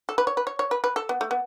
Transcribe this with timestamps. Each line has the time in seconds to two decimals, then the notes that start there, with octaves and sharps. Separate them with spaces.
0.09 A4
0.18 B4
0.27 C#5
0.37 B4
0.47 C#5
0.59 C#5
0.71 B4
0.84 B4
0.96 A4
1.09 B3
1.21 A3
1.31 B3